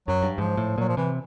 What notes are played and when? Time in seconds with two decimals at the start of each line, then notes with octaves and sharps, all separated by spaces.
0.08 F#2 F#3
0.23 G2
0.38 G#2 F3
0.57 A2
0.78 A#2 F#3
0.89 F3
0.97 C3 E3